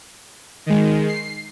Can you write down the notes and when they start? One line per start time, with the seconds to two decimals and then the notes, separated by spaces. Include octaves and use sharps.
0.66 D#3 G#3
1.08 C7